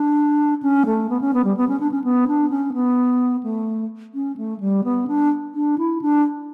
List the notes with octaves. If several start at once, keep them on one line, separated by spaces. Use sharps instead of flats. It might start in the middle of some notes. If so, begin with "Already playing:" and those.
Already playing: D4
C#4
A3
B3
C#4
B3
G3
B3
C#4
D4
C#4
B3
D4
C#4
B3
A3
C#4
A3
G3
B3
D4
D4
E4
D4